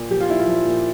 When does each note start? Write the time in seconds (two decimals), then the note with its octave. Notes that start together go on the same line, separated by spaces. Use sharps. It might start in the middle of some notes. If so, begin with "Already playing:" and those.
Already playing: A#2
0.10 F3 G4
0.21 F4
0.28 A#2 E4
0.40 F4
0.47 F3
0.65 A#2